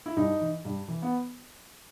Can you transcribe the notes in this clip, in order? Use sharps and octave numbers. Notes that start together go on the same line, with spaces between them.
E4
G2 D#4
E3
G2
E3
B3